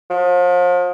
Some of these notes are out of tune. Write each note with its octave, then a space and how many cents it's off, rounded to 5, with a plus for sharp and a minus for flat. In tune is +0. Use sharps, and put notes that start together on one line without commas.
F3 +35